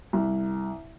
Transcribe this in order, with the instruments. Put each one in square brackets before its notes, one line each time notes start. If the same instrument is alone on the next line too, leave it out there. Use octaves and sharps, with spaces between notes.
[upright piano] C2